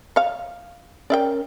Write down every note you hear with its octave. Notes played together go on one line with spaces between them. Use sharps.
C#5 F5
C#4 A#4 D5 E5 G5